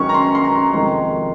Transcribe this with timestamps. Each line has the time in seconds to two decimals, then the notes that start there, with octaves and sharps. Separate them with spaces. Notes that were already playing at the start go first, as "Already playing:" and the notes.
Already playing: F#2 D#3 G#3 C#4 C#6
0.09 A#5
0.14 C6
0.35 C6
0.44 A#5
0.73 F2 C3 D#3 G#3 C6